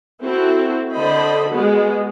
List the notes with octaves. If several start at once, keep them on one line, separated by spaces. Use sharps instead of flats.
C4 E4 F#4 A4
D3 C5 D#5 B5
G#3 B3 F#4